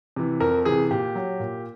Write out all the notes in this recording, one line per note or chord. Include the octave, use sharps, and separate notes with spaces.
C3 E3
F2 A#4
C3 E3 G#4
A#2 G4
F#3
A#2